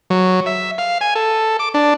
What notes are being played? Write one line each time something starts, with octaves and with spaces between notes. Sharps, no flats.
F#3
E5
F5
G#5
A4
D6
D4